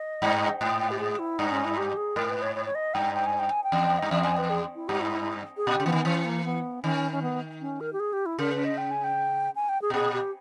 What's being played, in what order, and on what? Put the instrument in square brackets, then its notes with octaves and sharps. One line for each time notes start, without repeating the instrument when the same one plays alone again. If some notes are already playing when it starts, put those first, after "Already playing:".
Already playing: [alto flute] D#5
[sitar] G2
[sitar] G#2 [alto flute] G5
[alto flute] G5
G4
G#4
E4
[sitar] G2 [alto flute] D#4
[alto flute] C#4
E4
G4
G#4
[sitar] G#2 [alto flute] A#4
[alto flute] B4
C#5
C#5
C#5
D#5
[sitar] G2 [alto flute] G5
[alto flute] G5
G#5
G5
G#5
G5
[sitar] E2
[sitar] G2 [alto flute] D#5
[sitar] E2 [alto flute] E5
[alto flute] G#5
B4
G#4
E4
[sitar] G2 [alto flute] G4
[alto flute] E4
G#4
[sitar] A#2 [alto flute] G4
[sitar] C#3
[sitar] E3 [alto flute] B3
[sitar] D#3
[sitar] E3 [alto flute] C#4
[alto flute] A#3
B3
[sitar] D#3 [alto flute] C#4
[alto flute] C#4
B3
C#4
A#4
G4
G#4
G4
E4
[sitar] C#3 [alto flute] A#4
[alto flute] B4
D#5
G5
G#5
G5
G#5
G5
G#4
[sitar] B2
[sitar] A#2 [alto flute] G#4
[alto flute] G4